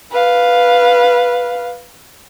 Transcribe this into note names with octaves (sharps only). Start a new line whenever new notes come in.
B4 F5